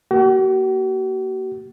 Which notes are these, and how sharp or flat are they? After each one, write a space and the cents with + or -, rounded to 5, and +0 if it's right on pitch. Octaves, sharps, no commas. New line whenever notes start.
A#3 +0 F#4 +45